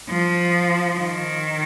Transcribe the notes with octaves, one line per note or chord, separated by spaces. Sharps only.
F3
D#3